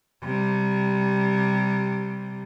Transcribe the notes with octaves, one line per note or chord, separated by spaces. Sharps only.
C3 G3